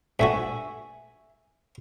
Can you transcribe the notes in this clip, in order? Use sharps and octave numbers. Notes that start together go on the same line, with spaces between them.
G2 A3 F#4 E5 G#5